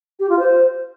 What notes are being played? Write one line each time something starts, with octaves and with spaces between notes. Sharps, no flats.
G4
F4
C5